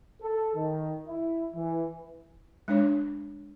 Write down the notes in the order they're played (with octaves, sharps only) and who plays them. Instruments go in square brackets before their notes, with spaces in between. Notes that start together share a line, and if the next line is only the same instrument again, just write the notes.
[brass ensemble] A4
D#3
E4
E3
[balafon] G#3 D4 C#5